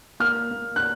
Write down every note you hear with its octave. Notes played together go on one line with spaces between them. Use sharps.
A#3 F6
A#3
F#6